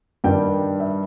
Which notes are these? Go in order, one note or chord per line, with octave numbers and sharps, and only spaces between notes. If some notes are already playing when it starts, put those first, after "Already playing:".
G2 D#3 G3 G5
E5